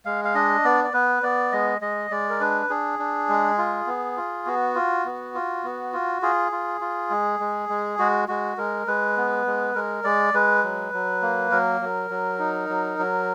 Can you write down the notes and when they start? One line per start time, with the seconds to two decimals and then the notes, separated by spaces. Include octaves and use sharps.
0.05 G#3 F5
0.24 F5
0.35 D4 D#5
0.64 B3 D5
0.84 D5
0.93 B3 B4
1.23 B3 D5
1.52 G#3 D#5
1.81 G#3 D#5
2.11 G#3 D5
2.30 A#4
2.40 D4 B4
2.70 D4 G#4
2.99 D4
3.29 G#3
3.58 F4
3.87 B3
4.17 F4
4.46 B3 F#4
4.75 F4
5.05 B3
5.35 F4
5.64 B3
5.93 F4
6.22 F4 G#4
6.52 F4
6.81 F4
7.10 G#3
7.40 G#3
7.69 G#3
7.99 G#3 F#4
8.28 G#3 F#4
8.57 G#3 A#4
8.87 G#3 B4
9.17 B3
9.46 G#3
9.75 G#3 A#4
10.04 G#3 D5
10.34 G#3 B4
10.63 F#3
10.93 F#3
11.22 A#3
11.51 F#3 A#4
11.81 F#3
12.10 F#3
12.39 D#4
12.69 F#3
12.99 F#3